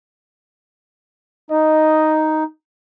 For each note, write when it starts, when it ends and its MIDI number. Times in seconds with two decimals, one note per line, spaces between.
1.51 2.44 63
1.51 2.35 75